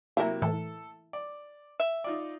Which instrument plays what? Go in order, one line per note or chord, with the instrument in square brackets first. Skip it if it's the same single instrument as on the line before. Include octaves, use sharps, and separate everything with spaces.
[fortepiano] C3 F#3 A#3 [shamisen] E4 A#4
[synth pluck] A2 E3 [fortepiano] A4
[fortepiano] D5
[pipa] E5
[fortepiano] D#4 F4 D5